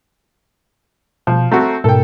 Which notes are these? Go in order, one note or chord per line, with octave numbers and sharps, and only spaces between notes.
B2 F3
A3 C4 F#4 A#5
G#2 B2 A4 A#4 G5